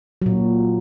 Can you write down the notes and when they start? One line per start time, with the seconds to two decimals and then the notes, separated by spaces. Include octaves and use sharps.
0.22 A#2 F#3